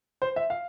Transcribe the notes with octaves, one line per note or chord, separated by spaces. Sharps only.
C5
E5
F5